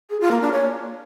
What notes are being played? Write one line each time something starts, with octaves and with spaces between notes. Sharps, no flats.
G#4
F4
A#3
D4
C#5